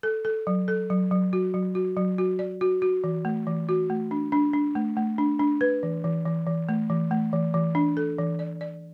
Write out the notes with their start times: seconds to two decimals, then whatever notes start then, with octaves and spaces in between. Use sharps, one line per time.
0.03 A4
0.25 A4
0.47 F#3
0.68 A4
0.90 F#3
1.11 F#3
1.33 F#4
1.54 F#3
1.75 F#4
1.97 F#3
2.18 F#4
2.39 D5
2.61 F#4
2.82 F#4
3.04 E3
3.25 A3
3.47 E3
3.69 F#4
3.90 A3
4.11 D4
4.32 D4
4.53 D4
4.76 A3
4.97 A3
5.18 D4
5.39 D4
5.61 B4
5.83 E3
6.04 E3
6.25 E3
6.47 E3
6.69 A3
6.90 E3
7.11 A3
7.33 E3
7.54 E3
7.75 D4
7.97 A4
8.18 E3
8.39 D5
8.61 D5